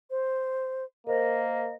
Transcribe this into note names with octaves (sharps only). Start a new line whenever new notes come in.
C5
A#3 A#4 C5 D#5